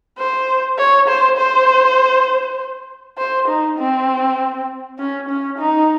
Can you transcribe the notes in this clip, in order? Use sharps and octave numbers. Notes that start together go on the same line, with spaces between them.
C5
C#5
C5
C5
C5
D#4
C4
C#4
C#4
D#4